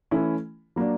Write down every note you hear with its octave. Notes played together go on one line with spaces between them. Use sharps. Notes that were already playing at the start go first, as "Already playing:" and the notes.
E3 A3 C#4 E4
F#3 A#3 D4